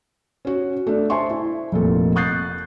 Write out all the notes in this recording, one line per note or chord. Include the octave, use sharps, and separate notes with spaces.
C#4 F#4
A3 D4
C5 E5 G#5 A5 C6 C#6
E4
F1 A#2 A4
C#6 D#6 F#6 G6 A6 C7